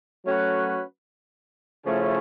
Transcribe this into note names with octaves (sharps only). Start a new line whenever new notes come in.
F#3 A3 C#4 F#4 B4
C#3 F3 A3 C#4 E4